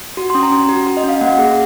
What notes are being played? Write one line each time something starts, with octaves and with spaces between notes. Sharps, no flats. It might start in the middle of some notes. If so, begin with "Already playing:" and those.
F#4
C#4 C6
A#5
C#4
F#4
F#4
D#5
C#4 F5
A#3 F#5
G#4 F#5